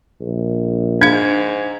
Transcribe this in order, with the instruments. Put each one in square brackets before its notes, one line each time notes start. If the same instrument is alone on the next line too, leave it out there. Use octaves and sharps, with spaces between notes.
[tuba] A#1
[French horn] G#2 [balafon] D4 F5 [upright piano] G#6